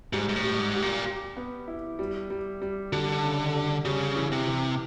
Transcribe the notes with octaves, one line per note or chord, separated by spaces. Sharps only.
G#2 G3
G#2
A2
G3
G#2
G4
A#2
G4
B3
E4
G3
G3
G3
D3 G3
C#3
G3
C#3 G3
E3
C3
E3